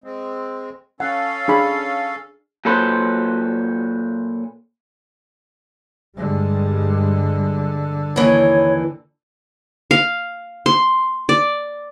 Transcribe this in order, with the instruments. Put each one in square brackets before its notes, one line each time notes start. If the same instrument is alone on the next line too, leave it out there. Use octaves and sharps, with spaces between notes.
[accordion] G#3 C4
[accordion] C#4 A4 F5 [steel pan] F#5
[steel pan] D4 G#4 B5
[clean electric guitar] A#2 F#3 A4 B4 C5
[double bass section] G2 G3 G#3 [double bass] D3
[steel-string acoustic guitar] D#2 E3 [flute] C#5
[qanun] F5
C6
D5